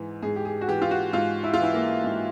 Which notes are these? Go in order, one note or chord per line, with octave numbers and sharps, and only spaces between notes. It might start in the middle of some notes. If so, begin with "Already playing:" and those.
Already playing: G#2 E3
G#2 G#4
G4
G#4
F#4
E3 G4
F4
F#4
G#2 F4
E4
F4
E3 E4
A#3
G#2